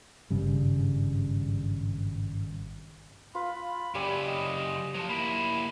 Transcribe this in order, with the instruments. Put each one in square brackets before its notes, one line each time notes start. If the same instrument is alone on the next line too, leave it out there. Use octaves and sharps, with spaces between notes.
[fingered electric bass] G#1 G2 C#3 G3
[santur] F4 B4 [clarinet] B5
[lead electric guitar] F#2 C#3 [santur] G4 D5 G#5 [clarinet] B5
[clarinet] D#5
[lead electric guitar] F3 F#3 [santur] D#5 A5
[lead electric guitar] A#3 E4 [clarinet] B5